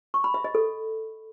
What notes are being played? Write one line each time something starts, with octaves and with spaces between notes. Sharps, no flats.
C#6
B5
E5
D#5
A4